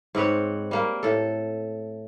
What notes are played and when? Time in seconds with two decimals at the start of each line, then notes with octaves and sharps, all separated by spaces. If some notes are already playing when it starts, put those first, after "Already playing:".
0.15 G#2 C4 B4 C#5
0.71 G3 A#3
1.03 A2 A4